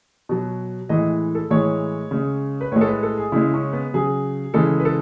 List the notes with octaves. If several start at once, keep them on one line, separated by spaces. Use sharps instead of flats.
B2 F#3
A2 E3 G#3 D#5
A4
A2 E3 G#3 C#5
C#3 G#3
B4
A2 G#3 C#5
A4
B4
A4
G#4
C#3 G#3 E4
C#4
B3
C#3 F#3 G#4
C#3 E3 G#3 A4
B4
A4